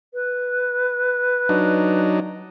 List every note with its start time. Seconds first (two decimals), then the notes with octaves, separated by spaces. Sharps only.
0.14 B4
1.49 F#3 D4 D#4